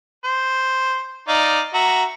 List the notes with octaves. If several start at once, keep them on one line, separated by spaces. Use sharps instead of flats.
C5
D#4 D5 F5
F#4 E5 A#5